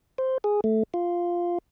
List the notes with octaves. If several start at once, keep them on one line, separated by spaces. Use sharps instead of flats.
C5
G#4
A3
F4